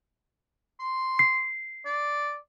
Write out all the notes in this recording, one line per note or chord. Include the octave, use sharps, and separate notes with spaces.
C6
C7
D5